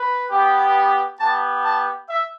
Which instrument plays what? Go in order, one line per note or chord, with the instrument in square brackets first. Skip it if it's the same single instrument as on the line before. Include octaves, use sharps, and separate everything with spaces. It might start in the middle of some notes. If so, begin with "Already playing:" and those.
Already playing: [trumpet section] B4
B3 G4
B3 G4 A5
A5
E5